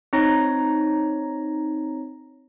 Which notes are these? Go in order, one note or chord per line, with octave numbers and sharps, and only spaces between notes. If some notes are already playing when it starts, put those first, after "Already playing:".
C4 D#4 C#5 A#5 A#6